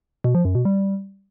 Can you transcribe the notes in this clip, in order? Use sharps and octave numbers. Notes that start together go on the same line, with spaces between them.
B2
F3
F#2
B2
G3